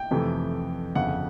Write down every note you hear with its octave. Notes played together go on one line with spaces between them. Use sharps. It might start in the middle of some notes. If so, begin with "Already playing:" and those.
Already playing: G5
F2 C3 E3 A3
G1 F2 C#3 F#5